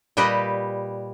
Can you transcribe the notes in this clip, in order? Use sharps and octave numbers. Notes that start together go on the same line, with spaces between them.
A#2 G3 G4 B4 D#5